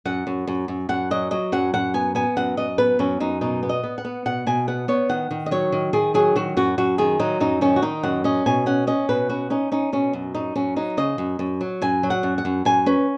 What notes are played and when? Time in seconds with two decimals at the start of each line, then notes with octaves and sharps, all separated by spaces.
0.05 F#2 F#5
0.27 F#2
0.47 F#2
0.68 F#2
0.89 F#2 F#5
1.11 F#3 D#5
1.31 F#3 D#5
1.52 F#2 F#5
1.74 F#2 F#5
1.94 B3 G#5
2.15 B3 G#5
2.37 F#2 F#5
2.57 F#2 D#5
2.78 B3 B4
2.99 F#2 C#4
3.20 F#2 D#4
3.41 B2 D#4
3.63 B3
3.69 D#5
3.83 B3
3.98 F#5
4.05 B3
4.26 B2 F#5
4.47 B2 G#5
4.67 B3 F#5
4.88 B3 C#5
5.09 D#3 F#5
5.31 D#3
5.46 D#5
5.51 F#3 C#5
5.72 D#3
5.93 D#3 G#4
6.14 F#3 G#4
6.36 D#3 F#4
6.57 F#2 F#4
6.78 F#2 F#4
6.98 D#3 G#4
7.19 F#3 D#4
7.40 F#2 D#4
7.61 D#3 C#4
7.76 F#4
7.82 D#3 D#4
8.03 F#2 F#5
8.24 C#4 D#5
8.46 B2 G#5
8.66 C#4 F#5
8.87 C#4 D#5
9.09 B2 B4
9.29 C#4 F#4
9.50 C#4 D#4
9.72 C#4 D#4
9.93 B2 C#4
10.13 F#2
10.35 F#2 D#4
10.56 F#2 C#4
10.76 F#3 D#4
10.97 C#3 D#5
11.18 F#2
11.39 F#2
11.61 F#3
11.82 F#2 G#5
12.03 F#3
12.10 F#5
12.23 F#2
12.38 F#5
12.45 F#2
12.65 F#2 G#5
12.86 C#4 B4